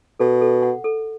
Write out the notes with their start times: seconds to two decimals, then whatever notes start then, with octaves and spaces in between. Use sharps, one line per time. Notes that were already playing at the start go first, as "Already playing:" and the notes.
0.20 B2 A4
0.41 A4
0.62 F#5
0.84 A4